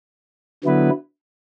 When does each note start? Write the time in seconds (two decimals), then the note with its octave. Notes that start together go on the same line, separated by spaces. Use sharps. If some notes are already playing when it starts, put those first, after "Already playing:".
0.64 D3 F#3 B3 E4 B4